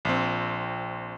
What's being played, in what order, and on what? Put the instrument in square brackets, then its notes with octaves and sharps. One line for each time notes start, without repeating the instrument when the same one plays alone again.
[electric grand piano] A#1 C4